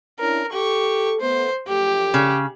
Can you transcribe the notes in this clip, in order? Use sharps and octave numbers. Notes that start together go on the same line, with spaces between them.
C#4 D4 E4 A#4
G4 A4 C#6
A3 B3 C5
F#2 F3 A3 G4
C#3